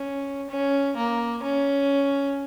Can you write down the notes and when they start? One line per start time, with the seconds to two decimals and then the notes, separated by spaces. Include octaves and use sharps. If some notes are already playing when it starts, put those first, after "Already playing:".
Already playing: C#4
0.50 C#4
0.97 A#3
1.43 C#4